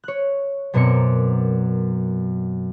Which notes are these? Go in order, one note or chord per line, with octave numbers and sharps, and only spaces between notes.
C#5 F#6
F#2 B2 C4 A#4 D5 C#7